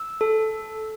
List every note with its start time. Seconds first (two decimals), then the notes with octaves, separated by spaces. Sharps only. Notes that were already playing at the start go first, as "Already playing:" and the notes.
Already playing: E6
0.21 A4